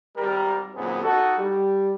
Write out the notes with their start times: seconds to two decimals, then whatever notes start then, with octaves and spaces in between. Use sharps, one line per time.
0.16 G#1 G3 A#4
0.74 F#2 A#2 D#3 B3 C4 G#4
1.03 D#4 F#4 A4
1.37 G3